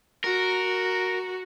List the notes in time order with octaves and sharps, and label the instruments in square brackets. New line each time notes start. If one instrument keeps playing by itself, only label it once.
[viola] F#4 [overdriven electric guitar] A#4